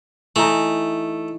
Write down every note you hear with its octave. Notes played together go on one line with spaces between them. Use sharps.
E3 A3 D#4